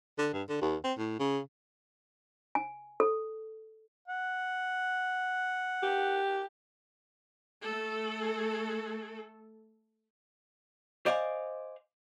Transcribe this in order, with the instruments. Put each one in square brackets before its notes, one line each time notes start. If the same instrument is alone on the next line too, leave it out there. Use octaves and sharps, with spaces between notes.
[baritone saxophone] D3
G2
D3
D#2
C4
A2
C#3
[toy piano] G#5
A4
[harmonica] F#5
[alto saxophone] G4
[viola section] A3 A4
[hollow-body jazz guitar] C5 D5 D#5 F5 G#5